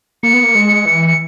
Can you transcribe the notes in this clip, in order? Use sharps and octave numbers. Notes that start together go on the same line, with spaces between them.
A#3 C#7
B3
A#3
G#3
E3
C#7